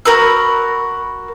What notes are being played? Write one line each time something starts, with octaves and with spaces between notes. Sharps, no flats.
F#4 A#4 B5 E6